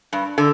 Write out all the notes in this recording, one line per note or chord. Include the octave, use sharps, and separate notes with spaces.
G2
D3